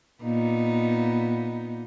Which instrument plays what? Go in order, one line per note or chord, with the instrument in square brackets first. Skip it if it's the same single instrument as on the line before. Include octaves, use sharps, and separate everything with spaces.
[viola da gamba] A#2 B3 D#4